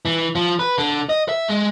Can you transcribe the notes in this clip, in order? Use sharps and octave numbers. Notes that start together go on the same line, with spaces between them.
E3
F3
B4
D3
D#5
E5
G#3